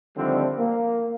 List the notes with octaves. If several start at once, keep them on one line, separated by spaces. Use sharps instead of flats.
D3 D#3 F3 G3 A3 C4
A#3